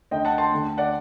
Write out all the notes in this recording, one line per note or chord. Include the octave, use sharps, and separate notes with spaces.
D2 D3 D#5 G5
F#5 A5
A5 C6
D2 D3
D5 F#5